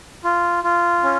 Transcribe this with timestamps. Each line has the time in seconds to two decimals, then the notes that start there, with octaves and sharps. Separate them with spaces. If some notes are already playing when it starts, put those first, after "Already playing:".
0.24 F4
0.64 F4
1.03 C#4